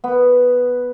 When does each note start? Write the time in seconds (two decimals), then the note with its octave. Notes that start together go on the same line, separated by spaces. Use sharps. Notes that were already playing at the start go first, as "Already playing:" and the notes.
0.04 B3